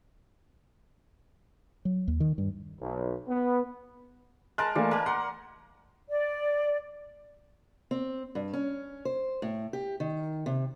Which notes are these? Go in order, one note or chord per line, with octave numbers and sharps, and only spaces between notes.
F#3
D#2
D#3
G2
B1
B3
G#3 A#4 A5 F#6
E3 A3 A#3 D5
A#3 A#4 A5
F#5 C6
D5
C4
G2
C#4
C5
A2
G4
D#3
C3